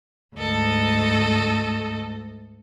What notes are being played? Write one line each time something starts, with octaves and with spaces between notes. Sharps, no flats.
D2 G#2 A3 A4 D#5